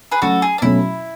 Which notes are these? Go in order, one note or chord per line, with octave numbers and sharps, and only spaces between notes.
G#4 B4
F#3 A3 C#4 F#4 A4
G#4
D4
B2 F#3 A3 C#4 E4